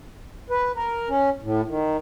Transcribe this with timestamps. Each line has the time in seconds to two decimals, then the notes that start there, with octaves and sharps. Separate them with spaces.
0.50 B4
0.76 A#4
1.09 C#4
1.43 A2
1.68 D#3